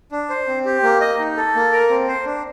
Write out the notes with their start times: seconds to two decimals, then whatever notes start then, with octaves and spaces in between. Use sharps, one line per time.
0.12 D4
0.29 C5
0.47 C4
0.65 G4
0.83 A#3
1.01 D#5
1.19 D#4
1.37 A4
1.55 A#3
1.72 A#4
1.90 C4
2.08 C5
2.25 D4